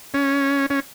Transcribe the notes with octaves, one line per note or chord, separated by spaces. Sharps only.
C#4
C#4